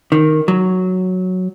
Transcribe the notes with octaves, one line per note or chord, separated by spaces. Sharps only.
D#3
F#3